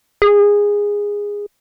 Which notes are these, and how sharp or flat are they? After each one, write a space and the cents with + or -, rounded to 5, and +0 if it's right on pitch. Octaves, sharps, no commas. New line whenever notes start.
G#4 -15